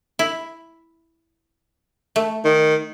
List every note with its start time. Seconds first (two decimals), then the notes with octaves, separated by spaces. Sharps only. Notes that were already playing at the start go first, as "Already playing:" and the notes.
0.19 E4
2.16 A3
2.45 D#3